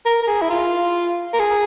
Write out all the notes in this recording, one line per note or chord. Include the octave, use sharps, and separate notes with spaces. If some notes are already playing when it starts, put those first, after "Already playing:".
A#4
A#4
G#4
E4
F4
A#4
G#4